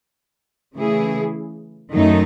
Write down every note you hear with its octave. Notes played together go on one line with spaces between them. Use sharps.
C#3 E3 A3 E4 G#4
F#2 D#3 A3 D#4